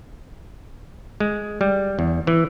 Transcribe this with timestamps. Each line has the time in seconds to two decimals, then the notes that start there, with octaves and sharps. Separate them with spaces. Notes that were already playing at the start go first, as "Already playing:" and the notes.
1.20 G#3
1.61 G3
1.99 E2
2.27 E3